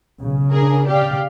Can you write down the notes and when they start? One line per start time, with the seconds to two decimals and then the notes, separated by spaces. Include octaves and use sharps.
0.20 B1 C#3
0.53 D4 G#4 A#4
0.87 G4 D5 F5